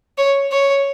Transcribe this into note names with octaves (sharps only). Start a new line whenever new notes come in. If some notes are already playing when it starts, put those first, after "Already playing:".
C#5
C#5